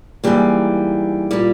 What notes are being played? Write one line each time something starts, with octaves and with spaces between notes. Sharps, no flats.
G#2 E3 G3 A#3
A#2 G3 A#3